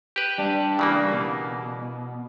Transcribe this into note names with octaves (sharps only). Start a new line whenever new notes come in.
G4 B4
G3 D4
C#3 E3 A#3
B2